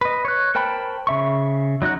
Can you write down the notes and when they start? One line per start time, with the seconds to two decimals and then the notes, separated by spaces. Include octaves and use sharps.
0.01 B4 D#5
0.25 C#5 F#6
0.55 A#4 C5 G5 A5 B5
1.07 C#3 E5 C#6
1.82 F#3 D#4 F#4 F#6